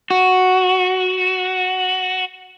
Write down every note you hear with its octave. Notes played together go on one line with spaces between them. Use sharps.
F#4